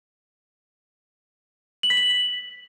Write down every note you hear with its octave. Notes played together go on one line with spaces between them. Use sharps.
F#7
B6
F#7